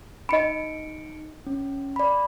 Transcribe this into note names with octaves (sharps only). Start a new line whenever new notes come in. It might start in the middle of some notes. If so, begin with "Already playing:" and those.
D#4 D#5 B5 C#7 D7
C#4
D5 B5